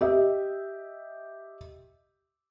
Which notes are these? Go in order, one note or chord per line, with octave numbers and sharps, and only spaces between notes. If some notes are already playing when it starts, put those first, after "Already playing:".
G4 D#5 E5